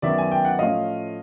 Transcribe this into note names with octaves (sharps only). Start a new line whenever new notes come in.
F#2 D#3 F#3 B3 D5 E5
G#5
G5
F#5
A2 F3 A3 C#4 D#5 F5